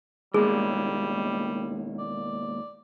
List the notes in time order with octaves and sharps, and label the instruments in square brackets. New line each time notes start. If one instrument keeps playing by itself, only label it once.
[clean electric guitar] D#2 B2 A#3 [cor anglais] G3 [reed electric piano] G#3 [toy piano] G#4
[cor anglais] D5